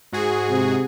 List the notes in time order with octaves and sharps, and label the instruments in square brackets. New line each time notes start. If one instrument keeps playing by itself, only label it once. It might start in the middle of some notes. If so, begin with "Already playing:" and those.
[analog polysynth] G#2 F#4 G#4
[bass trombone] C3